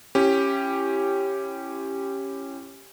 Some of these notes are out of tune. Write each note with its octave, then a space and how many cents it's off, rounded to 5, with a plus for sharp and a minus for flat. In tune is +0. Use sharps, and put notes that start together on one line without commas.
C#4 -15 E4 +30 G4 +0